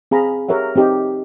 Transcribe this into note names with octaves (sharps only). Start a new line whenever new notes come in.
C4 G#4 F5 A#5 B5
G4 G#4 A#4 C#5 E5 F#5
C4 D#4 G4 D#5 G5